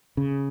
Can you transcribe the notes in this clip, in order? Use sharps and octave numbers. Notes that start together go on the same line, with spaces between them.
C#3